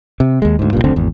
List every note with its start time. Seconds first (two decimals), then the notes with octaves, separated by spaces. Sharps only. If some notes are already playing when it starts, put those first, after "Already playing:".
0.20 C3
0.42 D#2 G#3
0.59 D2 G#2
0.73 C2 G2 A#2
0.84 F#1 D2 D3 C4
0.96 G#1 E2